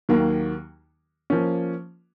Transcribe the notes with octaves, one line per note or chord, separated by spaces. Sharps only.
D#2 D#3 F#3 A#3
F3 A#3 C#4